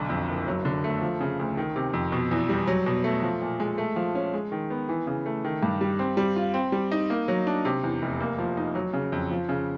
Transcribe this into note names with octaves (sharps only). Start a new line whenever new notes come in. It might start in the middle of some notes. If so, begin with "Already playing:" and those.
Already playing: B1 D3
F2
F#1
F#3
D3
A3
F3
C#3
D2
D#3
C3
F2
B2
E2
G3
F#3
B2
A3
F3
A#2
G#3
A3
F3
C#4
G#3
D#3
B3
E3
C#3
A3
D#3
G2
G3
C4
G3
F4
C4
G3
D#4
A#3
F#3
D4
C3
E2
F1
A#3
F3
D#4
F#3
C#3
F2
F3
C#3